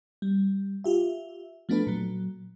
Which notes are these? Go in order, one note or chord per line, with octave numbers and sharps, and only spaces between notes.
G3
F4 G4 E5
F3 A3 B3 D4 A4 B4
A#2 F#3